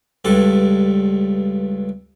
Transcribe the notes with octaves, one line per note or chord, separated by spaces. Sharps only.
C#2 G2 A4